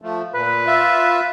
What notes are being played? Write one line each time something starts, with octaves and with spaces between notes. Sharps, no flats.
F3 A3
A#2 B4
F4 E5